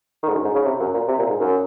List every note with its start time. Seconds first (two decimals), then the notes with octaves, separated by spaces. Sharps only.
0.23 D#3
0.29 G#2
0.34 F#2
0.44 G#2
0.55 C#3
0.66 C3
0.80 F#2
0.94 A#2
1.08 C3
1.18 A#2
1.29 G#2
1.40 F#2